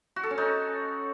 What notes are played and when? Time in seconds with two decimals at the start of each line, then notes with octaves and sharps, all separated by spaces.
0.16 F#4
0.23 A4
0.31 C#4
0.38 D#4